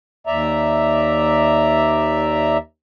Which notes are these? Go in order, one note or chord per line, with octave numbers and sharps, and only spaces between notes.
D#2 D5 E5 A#5